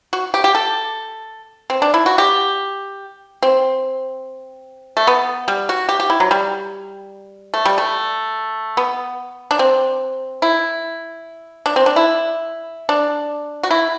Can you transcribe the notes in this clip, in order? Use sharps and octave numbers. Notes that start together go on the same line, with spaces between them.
F#4
G4
G4
A4
C4
D4
E4
F#4
G4
C4
A3
B3
G3
F#4
G4
G4
E4
F#3
G3
A3
G3
A3
B3
D4
C4
E4
D4
C4
D4
E4
D4
F#4
E4